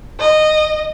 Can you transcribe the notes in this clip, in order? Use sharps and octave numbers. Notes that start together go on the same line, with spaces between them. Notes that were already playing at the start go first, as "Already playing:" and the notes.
D#5